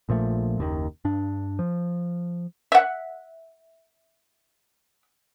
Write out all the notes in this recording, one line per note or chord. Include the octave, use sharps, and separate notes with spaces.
A#1 A#2 F3 A3
F#1 D#2 D#3
G2 D4
F3
E5 F#5